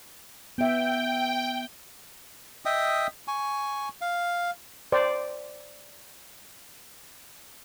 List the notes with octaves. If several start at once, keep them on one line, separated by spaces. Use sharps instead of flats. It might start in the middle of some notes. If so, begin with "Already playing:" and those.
B3 E5 G5
D#5 E5 G5 D#6
G#5 C#6
F5
C5 D5